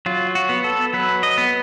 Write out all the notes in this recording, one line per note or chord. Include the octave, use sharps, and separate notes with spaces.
F#3 F4
F#4
B3
A4
F#3 B4
D#5
B3